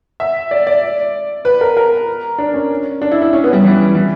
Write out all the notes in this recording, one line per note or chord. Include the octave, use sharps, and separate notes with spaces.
E5
D5
D5
B4
A#4
A#4
D4
C#4
D4
E4
E4
C#4
B3
G3
E3
E3